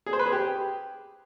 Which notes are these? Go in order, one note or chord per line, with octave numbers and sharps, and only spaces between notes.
G#4
C5
B4
G#4
G4